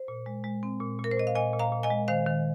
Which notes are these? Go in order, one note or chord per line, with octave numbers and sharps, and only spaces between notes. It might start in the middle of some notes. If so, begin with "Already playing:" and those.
Already playing: C5
A#2
G#3
G#3
C4
A#2
A#2 A#4
C5
A#2 D#5
F5
A#2 D#5 G#5
A#2
F5 A#5
A#2
D#5 G#5
G#3
D#3 C5 F5
D#3